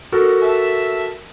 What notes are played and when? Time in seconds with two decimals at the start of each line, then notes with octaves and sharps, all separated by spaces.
0.12 F#4 A4 A#4
0.42 E5 A5